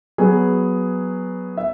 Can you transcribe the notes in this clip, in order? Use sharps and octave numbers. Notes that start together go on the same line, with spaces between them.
F#3 B3 G#4
E5